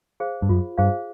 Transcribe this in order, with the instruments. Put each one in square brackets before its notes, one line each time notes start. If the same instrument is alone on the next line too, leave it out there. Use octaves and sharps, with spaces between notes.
[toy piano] G#4 C5 F5
[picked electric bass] G2
[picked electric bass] F#2 [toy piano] F4
[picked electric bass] G2 [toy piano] G#4 C5 F5